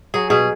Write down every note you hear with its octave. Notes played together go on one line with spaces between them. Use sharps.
F#3 G#4
B2 G#4